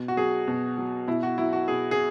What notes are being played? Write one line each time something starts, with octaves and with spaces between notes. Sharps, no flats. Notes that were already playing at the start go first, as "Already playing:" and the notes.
Already playing: B2
F#4
F#3 G#4
B2
F#3
B2 E4
F#4
F#3 E4
F#4
B2 G#4
G#4